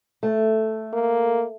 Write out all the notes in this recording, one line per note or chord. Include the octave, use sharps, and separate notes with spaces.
A3
A#3